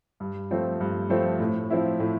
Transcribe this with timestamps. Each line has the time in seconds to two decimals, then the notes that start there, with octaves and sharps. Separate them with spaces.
0.20 G2
0.51 F3 A3 C4
0.80 G2
1.10 F3 A3 C4
1.40 A2
1.70 F3 C4 E4
2.00 A2